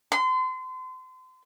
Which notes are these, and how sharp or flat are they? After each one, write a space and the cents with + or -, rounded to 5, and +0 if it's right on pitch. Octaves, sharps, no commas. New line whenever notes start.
C6 -35